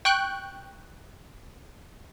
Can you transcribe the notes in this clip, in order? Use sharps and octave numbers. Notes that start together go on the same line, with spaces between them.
G5 C#6 F#6 G6